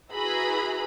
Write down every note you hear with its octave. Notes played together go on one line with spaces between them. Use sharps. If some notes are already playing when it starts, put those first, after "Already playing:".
E4 F#4 G#4 B4 A#5 B5